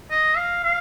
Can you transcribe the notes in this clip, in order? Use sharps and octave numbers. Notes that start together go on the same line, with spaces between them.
D#5
F5
F5